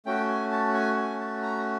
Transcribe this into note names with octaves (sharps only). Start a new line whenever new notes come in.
A3 C#4 F#4 G5
G#5
A5
G#5
G#5
A5
A#5